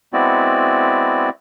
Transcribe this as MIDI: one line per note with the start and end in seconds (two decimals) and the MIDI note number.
0.13 1.29 56
0.13 1.29 59
0.13 1.29 60
0.13 1.29 64
0.13 1.29 66
0.13 1.29 74